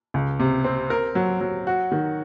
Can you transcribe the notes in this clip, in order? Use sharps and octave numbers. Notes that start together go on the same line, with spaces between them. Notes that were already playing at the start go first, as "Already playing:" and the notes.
C#2
C3
C4
A#4
F#3
F#3
F#4
D#3